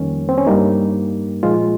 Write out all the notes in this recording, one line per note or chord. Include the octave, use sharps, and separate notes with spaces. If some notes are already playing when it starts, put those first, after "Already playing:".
Already playing: F2 D#3 G3 A#3 C#4
C4
C#4
G2 G3 A#3 D#4
A#2 F3 G#3 F4